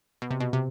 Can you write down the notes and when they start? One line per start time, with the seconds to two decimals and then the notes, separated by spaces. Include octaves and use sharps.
0.22 B2
0.31 C3
0.40 B2
0.53 C3